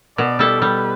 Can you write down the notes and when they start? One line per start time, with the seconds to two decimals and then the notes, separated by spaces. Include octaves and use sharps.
0.18 B2 D5
0.39 G3 E4 A4
0.61 G3 B4